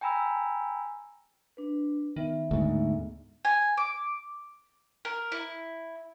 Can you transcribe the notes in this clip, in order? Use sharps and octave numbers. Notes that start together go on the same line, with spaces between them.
G5 G#5 A#5 B5 E6
D4 B4
D#3 B3 E5
D2 G#2
G#5
D6
A#4
E4